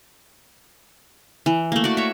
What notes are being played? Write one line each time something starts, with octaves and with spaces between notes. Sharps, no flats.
E3
A3 A#3
F#4 D5
C#5 E5